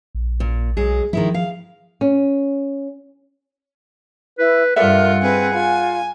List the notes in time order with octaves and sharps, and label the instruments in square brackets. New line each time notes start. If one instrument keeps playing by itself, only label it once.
[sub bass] A#1
[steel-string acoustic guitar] A#2
[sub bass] B1 [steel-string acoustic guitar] F#3 G#3 G#4
[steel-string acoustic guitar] D#3 G#3 E4 [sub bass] F3
[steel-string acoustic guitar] F5
[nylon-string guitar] C#4
[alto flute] E4 [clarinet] B4
[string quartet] G2 F4 [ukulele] A4 D5 E5 [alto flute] A#4 [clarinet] F#5
[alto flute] C4 [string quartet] G#4 B4
[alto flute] F4 [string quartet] G#5